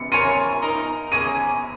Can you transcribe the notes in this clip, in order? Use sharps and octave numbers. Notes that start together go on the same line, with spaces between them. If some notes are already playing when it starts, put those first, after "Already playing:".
Already playing: C#7
F4 A#4 C#5 G#5 D#7
D#4 A#4 F5
A#3 C#4 G#4 D#7